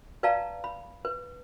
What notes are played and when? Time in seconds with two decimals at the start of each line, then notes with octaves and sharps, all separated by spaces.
0.23 B4 D5 F5 A5 A#5
0.64 B5
1.05 B4